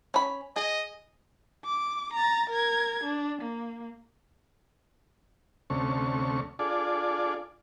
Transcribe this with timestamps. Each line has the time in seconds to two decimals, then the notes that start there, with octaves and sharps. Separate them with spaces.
0.14 C#4 B5
0.56 G#4 D#5
1.65 D6
2.13 A#5 A6
2.50 A#4 G#6
3.04 D4
3.42 A#3
5.70 D2 C3 A3 C#4 C#6
6.59 D4 F4 G#4 A4 D5